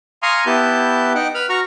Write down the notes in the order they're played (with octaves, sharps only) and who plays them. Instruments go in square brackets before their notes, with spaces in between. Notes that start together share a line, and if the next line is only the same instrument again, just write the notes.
[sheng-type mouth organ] F5 G#5 A#5 C6 C#6 D#6
B3 E4 G4 B4 A5 G6
D#4 F#5 G5
B4 B5 F6
F#4 A#5 C#6 F6